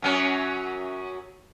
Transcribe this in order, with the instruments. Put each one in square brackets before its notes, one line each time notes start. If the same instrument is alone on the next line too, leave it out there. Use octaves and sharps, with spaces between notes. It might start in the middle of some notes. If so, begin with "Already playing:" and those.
[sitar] F#2 F#3 C#4